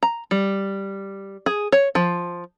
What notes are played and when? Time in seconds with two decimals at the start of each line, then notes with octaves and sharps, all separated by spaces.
0.03 A#5
0.31 G3
1.46 G#4
1.72 C#5
1.95 F3